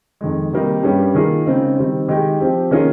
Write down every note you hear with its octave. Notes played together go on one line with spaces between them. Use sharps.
F2 D#3 G#3
C3 D#3 G3 A#3 D#4
G2 G3 C#4 G4
D#3 A#3 F4 G#4
C#3 G#3 C4 D#4
D#3 G3 C4
D#3 G#3 D#4 G4
F3 C4 G4
D#3 A#3 C#4 F4 G#4